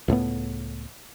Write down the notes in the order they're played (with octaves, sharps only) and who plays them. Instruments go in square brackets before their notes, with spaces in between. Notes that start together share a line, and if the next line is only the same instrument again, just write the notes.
[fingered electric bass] C#2 A2 A3 B3